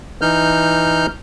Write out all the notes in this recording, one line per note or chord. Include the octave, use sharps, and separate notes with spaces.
E3 D#4 F6 G6